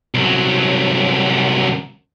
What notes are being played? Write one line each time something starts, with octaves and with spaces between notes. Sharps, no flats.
C2 F#3